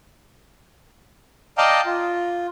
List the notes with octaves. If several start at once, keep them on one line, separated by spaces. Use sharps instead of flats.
D5 D#5 F5 G5 A5 A#5
F4